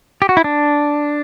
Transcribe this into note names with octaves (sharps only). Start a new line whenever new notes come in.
G4
F#4
E4
D4